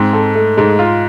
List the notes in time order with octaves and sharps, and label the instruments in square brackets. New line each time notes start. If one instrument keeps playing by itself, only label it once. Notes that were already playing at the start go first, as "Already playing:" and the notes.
Already playing: [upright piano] G#2 [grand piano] C4
[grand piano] A4
A3
[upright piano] G#2 [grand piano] G#3
[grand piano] F4